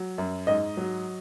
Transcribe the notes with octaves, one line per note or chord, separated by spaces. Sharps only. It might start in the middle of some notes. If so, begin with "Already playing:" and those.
Already playing: F#3
F#2
G#2 D#5
F#3